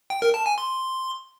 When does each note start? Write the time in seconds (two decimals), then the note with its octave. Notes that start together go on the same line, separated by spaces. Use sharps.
0.10 G5
0.22 A#4
0.34 A5
0.46 G#5
0.58 C6